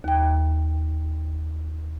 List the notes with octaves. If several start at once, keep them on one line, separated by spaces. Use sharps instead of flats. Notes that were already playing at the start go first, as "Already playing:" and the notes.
D#2 G5